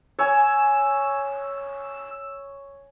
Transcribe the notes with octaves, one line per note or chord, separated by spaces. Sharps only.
C#5 G#5 E6